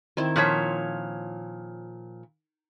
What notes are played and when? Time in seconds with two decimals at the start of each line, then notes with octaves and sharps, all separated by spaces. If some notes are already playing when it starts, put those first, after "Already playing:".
0.17 D#3 C4 E4
0.36 A#2 F3 C#5 F#5